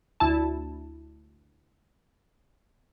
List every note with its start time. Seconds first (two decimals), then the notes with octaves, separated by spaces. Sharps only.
0.20 D2 E4 A5